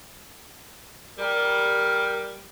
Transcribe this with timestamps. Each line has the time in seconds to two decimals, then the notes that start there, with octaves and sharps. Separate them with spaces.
1.18 G3 A#4